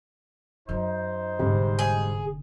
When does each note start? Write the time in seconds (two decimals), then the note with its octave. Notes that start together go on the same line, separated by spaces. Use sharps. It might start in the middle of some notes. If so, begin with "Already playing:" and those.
0.69 F#2 D#4 C5
1.39 F1 G#2 D3 G3
1.79 G#4